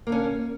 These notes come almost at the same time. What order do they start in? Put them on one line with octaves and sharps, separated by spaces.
A#3 D3 C#4